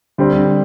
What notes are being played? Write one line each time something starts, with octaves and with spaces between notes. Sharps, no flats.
D3 G3 C4